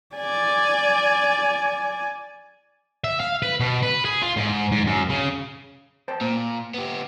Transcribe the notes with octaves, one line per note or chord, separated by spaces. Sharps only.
D5 G#5
E5
F5
B4
B2
B4
G#4
F4
G#2
G#2
F#2
C#3
C5 G5 A5
A#2 A#3
B3 G4